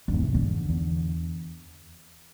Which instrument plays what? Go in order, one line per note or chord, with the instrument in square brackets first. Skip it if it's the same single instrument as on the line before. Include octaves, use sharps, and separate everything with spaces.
[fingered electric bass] E2 G#2 [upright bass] D3
[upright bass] C3
D3
[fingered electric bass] E2